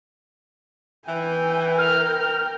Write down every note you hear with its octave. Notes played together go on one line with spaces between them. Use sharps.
E3 G5 G#5
A#4 G5 F6